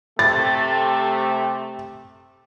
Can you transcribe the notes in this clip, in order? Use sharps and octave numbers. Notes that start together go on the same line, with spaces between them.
C3 A3 G4 A6